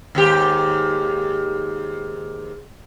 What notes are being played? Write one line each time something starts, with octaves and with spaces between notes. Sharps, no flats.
D#2 G#2 G4